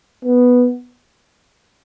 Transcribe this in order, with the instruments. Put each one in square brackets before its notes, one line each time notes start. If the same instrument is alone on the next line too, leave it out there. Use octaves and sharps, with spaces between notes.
[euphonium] B3